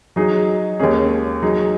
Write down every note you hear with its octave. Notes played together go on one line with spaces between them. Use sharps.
F#3 D#4 G#4 D#5
D#2 D#3 G#3 C#4 G#4
F#3 D#4 G#4